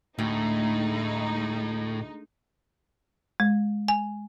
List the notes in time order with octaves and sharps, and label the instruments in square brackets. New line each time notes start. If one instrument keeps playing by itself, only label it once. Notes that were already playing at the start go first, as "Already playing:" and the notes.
[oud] D2 [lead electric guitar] A2 [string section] G#3 D#4
[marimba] G#3
G#5